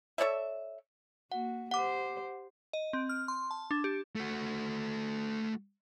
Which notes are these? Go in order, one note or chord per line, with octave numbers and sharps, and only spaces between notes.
A4 C#5 D5 E5
A#3 F#4 F#5
G4 C5 F#5 D6
D#5
C4
F6
C6
A5
D4
G4
A3 F#4